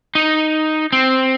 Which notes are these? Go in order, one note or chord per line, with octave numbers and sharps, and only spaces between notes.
D#4
C4